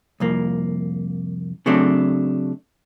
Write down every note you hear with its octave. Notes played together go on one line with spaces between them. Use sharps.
C2 F2 A#3
C#3 F#3 A3 C4 D4